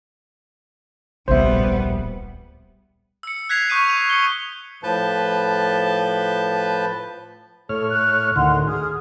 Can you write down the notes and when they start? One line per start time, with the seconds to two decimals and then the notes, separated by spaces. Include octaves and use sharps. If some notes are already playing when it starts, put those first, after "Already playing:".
1.28 D1 A#1 G3 B3 C5 E5
3.23 E6 C#7
3.49 F#6 G#6 B6 C7 F7
3.70 C#6 D#6 G6 D#7
3.88 D#7 F7
4.10 D#6 C#7 G7
4.83 A2 F3 B4 A5 G6
7.69 A2 A4 C#5 F6
7.90 F#6
8.36 D2 A2 D#3 F#5 C6
8.67 G#4 D#6 F6